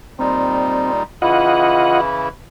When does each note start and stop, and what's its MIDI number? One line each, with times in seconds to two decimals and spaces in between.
0.19 1.03 46
0.19 1.03 55
0.19 0.92 60
0.19 1.03 63
1.22 2.29 49
1.22 2.29 52
1.22 2.29 64
1.22 2.01 65
1.22 2.01 75
1.22 2.01 78